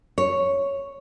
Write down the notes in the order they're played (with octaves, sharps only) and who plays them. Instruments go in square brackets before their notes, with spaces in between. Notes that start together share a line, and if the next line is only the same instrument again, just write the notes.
[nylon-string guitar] C#5